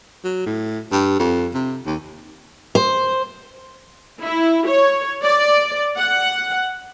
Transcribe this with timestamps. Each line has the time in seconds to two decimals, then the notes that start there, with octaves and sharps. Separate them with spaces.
0.24 F#3
0.46 A2
0.92 G2
1.19 F2
1.54 C3
1.86 D#2
2.75 C5
4.22 E4
4.67 C#5
5.23 D5
5.98 F#5